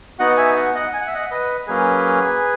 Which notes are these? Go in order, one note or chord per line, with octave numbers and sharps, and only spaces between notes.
B3 D#4 F#4 D#5 F#5
E5 G#5
D#5 F#5
D#5 F#5
G#5
F#5
E5
D#5 F#5
B4 D#5
F#3 A#3 C#4 G#4 B4